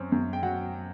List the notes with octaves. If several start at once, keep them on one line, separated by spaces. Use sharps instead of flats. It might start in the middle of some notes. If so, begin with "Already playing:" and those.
Already playing: F#2 C4
F#2
G5
F#3 F#5